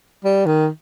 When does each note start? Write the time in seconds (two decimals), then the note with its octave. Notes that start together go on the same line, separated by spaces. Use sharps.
0.24 G3
0.46 D#3